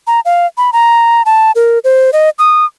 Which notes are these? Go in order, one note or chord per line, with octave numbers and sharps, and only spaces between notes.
A#5
F5
B5
A#5
A5
A#4
C5
D#5
D#6